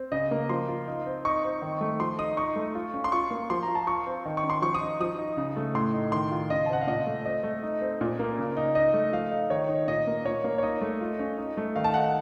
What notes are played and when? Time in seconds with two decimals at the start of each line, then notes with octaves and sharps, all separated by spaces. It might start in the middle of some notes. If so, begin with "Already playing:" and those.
Already playing: C4
0.12 C#3 D#5
0.31 A#3
0.49 F3 C6
0.68 F4
0.88 D#4
1.06 C4
1.25 D#4 C#6
1.44 C4
1.62 D#3
1.81 A3
2.00 F3 C6
2.18 D#4 D#6
2.37 D#4 C#6
2.56 A3
2.75 F4
2.94 C#4
3.04 C6
3.12 F4 C#6
3.31 A#3
3.50 F3 C6
3.63 A#5
3.68 F4
3.75 A5
3.87 F4 C#6
4.07 C4
4.25 D#3
4.37 C#6
4.43 C#4
4.50 C6
4.62 F3 C#6
4.75 D#6
4.81 D#4
5.00 F3 D#6
5.18 D#4
5.37 C#3
5.56 A3
5.75 A2 C6
5.93 D#4
6.12 D#3 C6
6.31 F4
6.50 C#3 D#5
6.66 A5
6.69 C4 F#5
6.81 F5
6.87 A#2 D#5
7.07 A3
7.25 C4 D#5
7.43 A3
7.63 D#4
7.81 C4
8.01 A#2
8.19 A#3
8.38 C#3
8.57 D#4
8.75 D#4 D#5
8.94 A3
9.12 F3 F5
9.31 D#4
9.50 D#3 C#5
9.69 D#4
9.88 A#2 D#5
10.07 A#3
10.25 A#2 C#5
10.44 A#3
10.58 C#5
10.63 D#4 D#5
10.81 A3
11.01 F4
11.19 C#4
11.38 D#4
11.57 A3
11.76 D#3 F5
11.84 A5
11.94 D#4 F#5
12.04 F#5